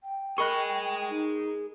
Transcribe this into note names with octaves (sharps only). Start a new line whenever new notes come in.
G5
G#4 A#4 D#5 B5 C#6 F#6
D#4